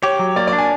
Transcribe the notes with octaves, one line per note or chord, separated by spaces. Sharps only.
G4 C#5
F#3
A#3 D5
D5
D4
G#5